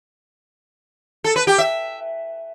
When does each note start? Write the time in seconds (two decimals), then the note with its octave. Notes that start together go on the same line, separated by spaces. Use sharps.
1.24 A4
1.36 B4
1.47 G4
1.58 E5